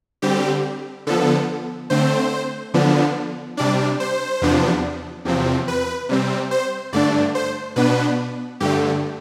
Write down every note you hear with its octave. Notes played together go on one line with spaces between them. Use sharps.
D3 G3 C4 G4
D3 F3 B3 A4
D3 A3 C4 C5
D3 F3 B3 D4
C3 G3 D4 D5
C5
E2 C3 F3 B3 D4
E2 C3 F3 C4
B4
C3 G3 C4
C5
G2 D3 A3 D4 D5
C5
B2 B3 D4 B4
G2 D3 A3 G4